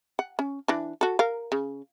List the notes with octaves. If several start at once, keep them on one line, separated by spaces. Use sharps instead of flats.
F#5
C#4
E3 D4
F#4 A4
A#4 F5
C#3